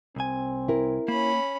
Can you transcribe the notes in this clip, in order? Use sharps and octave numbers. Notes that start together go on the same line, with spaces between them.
C2 C4 G#5
E4 A#4
A#3 C#4 B5